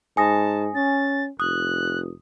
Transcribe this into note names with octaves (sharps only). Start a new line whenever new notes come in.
G#2 G#5 A5 D#6 A#6
C#4 A6
F1 D#6 F#6